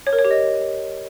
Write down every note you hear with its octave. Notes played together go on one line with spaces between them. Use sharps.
C#5
A#4
C#5
G4
D#5